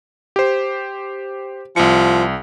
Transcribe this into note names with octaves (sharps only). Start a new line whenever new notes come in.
G4 C5
C2 F3 C#7